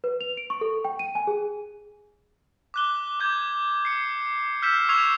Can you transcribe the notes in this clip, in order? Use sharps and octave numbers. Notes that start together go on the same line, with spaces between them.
B4
F7
D7
C#6
A4
G5
D#7
G#5
G#4
D6 F#6 G7
D6 G6 G#6
C7 C#7
E6 F6 G6 B6 C7 E7
C#6 E6 G#6 C7 E7 F7